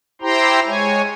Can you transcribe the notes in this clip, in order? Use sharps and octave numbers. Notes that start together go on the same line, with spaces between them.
E4 G4 C5 G5 A#5 C6
G#3 C#5 G#5